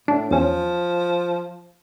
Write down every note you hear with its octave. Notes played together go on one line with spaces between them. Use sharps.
A2 D4
E2 F3 C#4